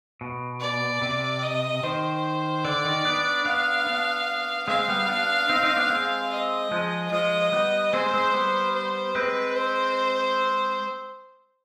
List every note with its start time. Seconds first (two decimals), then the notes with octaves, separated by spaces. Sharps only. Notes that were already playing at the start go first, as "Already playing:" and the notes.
0.21 B2
0.61 D5
1.02 C3
1.43 D#5
1.83 D#3 C5
2.64 D3 D5
2.85 D#3
3.05 B3 D4
3.45 B3 D4 F5
3.87 B3 D4
4.68 G#3 C4 F5
4.88 G3 B3
5.09 B3 D4
5.49 C4 D#4
5.63 C4 D#4
5.77 B3 D4
5.89 G#3 C4
6.31 D#5
6.71 F3 G#3
7.12 F3 G#3 D#5
7.52 G3 B3
7.93 G#3 C4 C5
8.14 G#3 C4
8.33 G3 B3
8.74 C5
9.15 G#3 C4 B4
9.55 C5